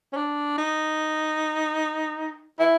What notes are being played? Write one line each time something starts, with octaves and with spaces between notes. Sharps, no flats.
C#4
D4
D#4
E4